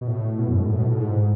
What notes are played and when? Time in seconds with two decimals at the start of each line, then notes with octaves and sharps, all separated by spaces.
0.01 B2
0.08 A2
0.39 B2
0.48 F#2
0.59 G#2
0.68 A2
0.79 B2
0.88 A2
0.98 G#2